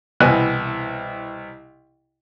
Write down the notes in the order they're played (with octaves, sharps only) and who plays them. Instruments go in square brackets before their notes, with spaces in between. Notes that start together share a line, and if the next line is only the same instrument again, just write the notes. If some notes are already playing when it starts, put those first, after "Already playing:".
[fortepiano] C2 B2 E3 G#5 F#6